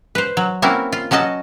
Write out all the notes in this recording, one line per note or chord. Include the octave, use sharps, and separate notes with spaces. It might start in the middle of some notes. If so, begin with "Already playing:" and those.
B4 C5
F#3
A#3 C4 C#4 E4 F#4 A#4
F4
F#3 C#4 F#4 D#5 A5